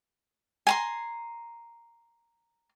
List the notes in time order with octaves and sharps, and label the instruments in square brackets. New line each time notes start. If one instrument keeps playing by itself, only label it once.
[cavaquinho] G#5 A#5 C6